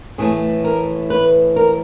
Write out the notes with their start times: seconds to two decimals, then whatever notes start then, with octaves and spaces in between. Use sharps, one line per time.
0.18 A2 E3 A3 G#4
0.64 A#4
1.10 B4
1.56 A#4